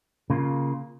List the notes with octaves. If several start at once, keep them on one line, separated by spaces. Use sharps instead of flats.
C#3 A#3 F4